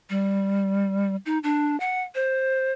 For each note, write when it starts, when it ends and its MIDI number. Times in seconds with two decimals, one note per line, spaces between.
0.10 1.16 55
1.26 1.39 63
1.43 1.78 62
1.80 2.02 78
2.15 2.72 72